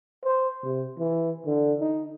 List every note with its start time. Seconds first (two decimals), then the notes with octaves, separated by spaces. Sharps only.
0.24 C5
0.63 C3
0.98 E3
1.46 D3
1.80 D#4